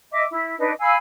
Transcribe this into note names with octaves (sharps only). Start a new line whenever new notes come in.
D#5 E5 D6
E4
D4 D#4 B4 D#5
F5 G#5 B5 E6